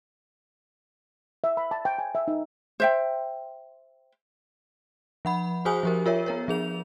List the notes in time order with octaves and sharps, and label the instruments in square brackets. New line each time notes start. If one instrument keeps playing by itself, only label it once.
[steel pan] E5
B5
A5
G5
G#5
E5
D#4
[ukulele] C5 E5 G5
[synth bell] F3 F#5 B5
F#4 G#4 C5 G#5 D#6
F3 G4 A#4
F4 A#4 C#5 E5
B3 A#4 C#5
F3 G#4 F7